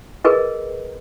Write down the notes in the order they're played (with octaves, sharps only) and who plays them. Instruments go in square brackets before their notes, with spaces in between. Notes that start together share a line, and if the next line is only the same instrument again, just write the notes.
[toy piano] G#4 A#4 B4 D#5